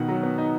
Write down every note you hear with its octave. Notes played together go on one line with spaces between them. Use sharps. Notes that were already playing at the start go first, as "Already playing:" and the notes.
Already playing: B2 D#3 F#5
F#3
B3
D#4